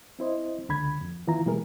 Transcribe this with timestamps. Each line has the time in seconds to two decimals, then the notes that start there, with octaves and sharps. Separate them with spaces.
0.19 C4 E4 C5 D#5
0.69 C#2 D3 B5 G#6
1.01 F2
1.27 D#3 E3 B3 E4 F4 A#5
1.46 B2 E3 G3 G#3 G#4 A#4